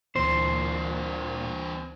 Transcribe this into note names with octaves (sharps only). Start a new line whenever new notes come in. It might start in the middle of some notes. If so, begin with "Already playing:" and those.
D2 A#2 E3 C4 D4 C5